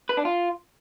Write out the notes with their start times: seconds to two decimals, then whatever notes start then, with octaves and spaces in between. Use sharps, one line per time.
0.09 B4
0.17 D4
0.25 F4